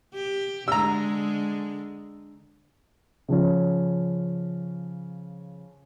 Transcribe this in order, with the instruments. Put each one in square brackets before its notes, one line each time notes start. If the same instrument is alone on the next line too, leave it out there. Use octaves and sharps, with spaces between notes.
[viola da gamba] G4
[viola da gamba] D3 G#3 [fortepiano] A#5 E6
[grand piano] C#3 F3 C#4